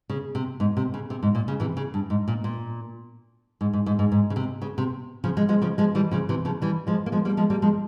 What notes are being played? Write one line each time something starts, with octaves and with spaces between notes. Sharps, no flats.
C#3
C3
G#2
C3
C#3
C3
G#2
A#2
C#3
C3 E3
C#3
G2
G#2
A#2
A#2
G#2
G#2
G#2
G#2
G#2
C#3
C3
C#3
C3
C#3 F3
F3 G#3
F3 G#3
C#3 F3
F3 G#3
E3 G3
C#3 F3
C3 E3
C#3 F3
E3 G3
F3 G#3
A#3
F3 G#3
G3 A#3
F3 G#3
G3 A#3
F3 G#3